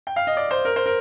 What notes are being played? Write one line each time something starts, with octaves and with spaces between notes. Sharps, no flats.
G5
F5
D#5
D5
C5
A#4
C5
A#4